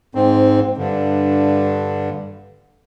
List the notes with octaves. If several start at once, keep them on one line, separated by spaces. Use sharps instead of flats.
G#2 C4
G2 D3